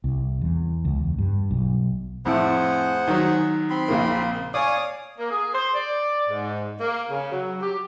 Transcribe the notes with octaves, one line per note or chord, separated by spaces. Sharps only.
C2
E2
C#2
E2
G2
B1
F2 A2 A3 G#4 C5 F#5
D#3 F#3
C4 B5 C6
A#1 C#3 A#3
C#5 D5 F5 G#5 D#6
A#3
G#4
C5
D5
G#2
A#3
C#3
F#3
G4